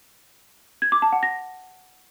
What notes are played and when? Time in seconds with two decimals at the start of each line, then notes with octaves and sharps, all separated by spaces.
0.82 G#6
0.92 D6
1.02 A5
1.12 F#5
1.23 A#6